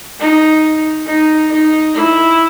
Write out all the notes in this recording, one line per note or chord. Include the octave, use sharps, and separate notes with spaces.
D#4
D#4
D#4
E4